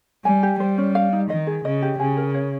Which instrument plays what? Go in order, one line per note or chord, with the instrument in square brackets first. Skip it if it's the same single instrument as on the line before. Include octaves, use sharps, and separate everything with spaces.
[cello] G3 [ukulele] G#5
[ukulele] G4
[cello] G3 [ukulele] C5
[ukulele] C#4
F5
D#4
[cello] D#3 [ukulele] D#5
[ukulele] G#4
[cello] C#3 [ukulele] D#5
[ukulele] G4
[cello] C#3 [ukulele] G#5
[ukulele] A#4
C#5